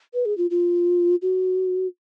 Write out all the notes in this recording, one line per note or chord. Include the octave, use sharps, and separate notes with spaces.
B4
G#4
F4
F4
F#4